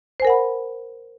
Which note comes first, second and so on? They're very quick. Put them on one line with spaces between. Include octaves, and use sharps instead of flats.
C5 G#5 A#4 F#5 B5